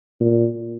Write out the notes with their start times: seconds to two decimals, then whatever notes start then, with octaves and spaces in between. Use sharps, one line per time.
0.20 A#2